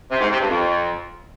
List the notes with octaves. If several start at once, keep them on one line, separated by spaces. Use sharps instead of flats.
C3
G#2
C3
G2
F2